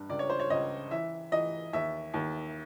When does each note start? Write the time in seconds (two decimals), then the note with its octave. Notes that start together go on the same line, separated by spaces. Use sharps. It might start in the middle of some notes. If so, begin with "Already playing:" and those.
Already playing: G2
0.09 C#2 D5
0.19 C#5
0.30 C5
0.40 C#5
0.50 C#2 D#5
0.91 E3 E5
1.32 E3 D#5
1.73 D#2 E5
2.14 D#2